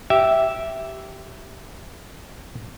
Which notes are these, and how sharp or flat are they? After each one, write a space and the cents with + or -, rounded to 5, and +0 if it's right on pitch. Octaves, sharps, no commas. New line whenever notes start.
G4 -15 E5 +0